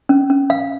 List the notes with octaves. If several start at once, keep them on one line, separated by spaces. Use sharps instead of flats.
C#4
C#4
F5